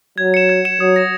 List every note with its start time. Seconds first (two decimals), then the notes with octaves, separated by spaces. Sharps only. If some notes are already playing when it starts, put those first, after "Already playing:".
0.18 F#3 G#6
0.34 C#7 E7
0.49 G#6
0.65 C#7 E7
0.80 F#3 D#6
0.96 A#6 E7